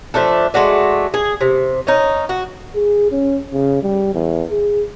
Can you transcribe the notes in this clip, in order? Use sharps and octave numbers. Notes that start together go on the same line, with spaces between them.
F3 A3 D4 A4
G#3 A3 F#4 D5
G#4
C3
C#4 D#4
F#4
G#4
C#4
C#3
G3
E2
G#4